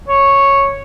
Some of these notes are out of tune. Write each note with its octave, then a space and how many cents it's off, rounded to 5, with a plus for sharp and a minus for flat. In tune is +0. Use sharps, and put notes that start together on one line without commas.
C#5 -5